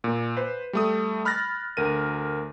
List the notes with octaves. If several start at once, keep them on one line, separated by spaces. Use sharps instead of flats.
A#2
B4 C5
G3 A3 D#6
B5 F6 F#6 A6 A#6
D2 A#4 D#7